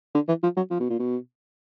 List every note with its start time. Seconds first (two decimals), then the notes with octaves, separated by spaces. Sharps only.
0.15 D3
0.28 E3
0.43 F3
0.57 F#3
0.71 F3
0.80 B2
0.90 A#2
1.00 B2